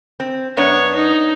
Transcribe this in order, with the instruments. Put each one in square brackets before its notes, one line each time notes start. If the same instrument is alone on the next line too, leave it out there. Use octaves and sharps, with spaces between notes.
[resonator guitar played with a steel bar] C4
[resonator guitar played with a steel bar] F#2 B3 D4 [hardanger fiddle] C#5
[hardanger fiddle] D#4